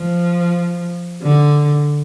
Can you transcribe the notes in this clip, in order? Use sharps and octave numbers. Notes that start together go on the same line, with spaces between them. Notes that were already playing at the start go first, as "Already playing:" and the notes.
Already playing: F3
D3